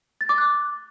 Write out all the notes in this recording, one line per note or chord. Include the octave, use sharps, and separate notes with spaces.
A6
D6
F#6